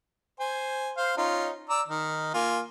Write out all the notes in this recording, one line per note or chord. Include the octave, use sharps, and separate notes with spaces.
C5 G#5
C5 F5
C#4 D#4 F4
D5 A#5 E6
D#3 D#4
A#3 F4 G#5